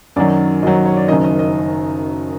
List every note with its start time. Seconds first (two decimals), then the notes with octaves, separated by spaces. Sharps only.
0.16 F#2 D#3 F#3 D5
0.62 F#2 D#3 F#3 D#5
0.85 C#5
0.97 D5
1.08 D#3 D#5
1.11 F#1 F#2
1.24 D#5
1.39 D#5